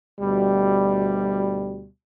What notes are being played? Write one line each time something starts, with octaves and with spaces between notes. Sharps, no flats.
D2 B2 G3